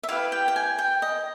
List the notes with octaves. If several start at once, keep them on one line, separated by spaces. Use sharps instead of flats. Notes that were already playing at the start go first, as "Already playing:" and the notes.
E5
E4 G4 B4 F5
G5
G5
G#5
G5
D#5